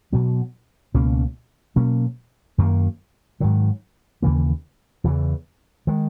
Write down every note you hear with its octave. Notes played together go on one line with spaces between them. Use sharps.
B2 F#3 B3
C#2 B2 A#3 C#4
B2 F#3 A#3 C#4
F#2 D#3 A#3
G#2 D#3 F#3
D#2 C#3 E3 A#3
E2 C#3 E3
D#3 G#3